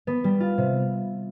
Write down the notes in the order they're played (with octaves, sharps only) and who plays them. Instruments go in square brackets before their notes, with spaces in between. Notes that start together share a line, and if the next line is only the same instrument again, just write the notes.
[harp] B3
G3
F4
C3